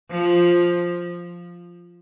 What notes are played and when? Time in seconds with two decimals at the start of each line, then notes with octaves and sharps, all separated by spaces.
0.11 F3